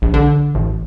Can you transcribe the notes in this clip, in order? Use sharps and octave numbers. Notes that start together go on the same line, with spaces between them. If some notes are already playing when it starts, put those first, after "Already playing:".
A#1
D3
A1